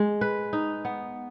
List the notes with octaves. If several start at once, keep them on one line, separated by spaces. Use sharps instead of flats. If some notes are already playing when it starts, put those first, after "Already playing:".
Already playing: G#3
B4
D#4
B3